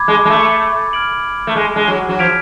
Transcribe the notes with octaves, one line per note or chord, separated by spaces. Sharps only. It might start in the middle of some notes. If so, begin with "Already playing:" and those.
Already playing: B5 D6 G#6
G#3
G#3
A3
F6 G#6 D7 F#7
A3
G#3
G#3
F#3
F#3
F3 F6 G#6 B6 D7 F7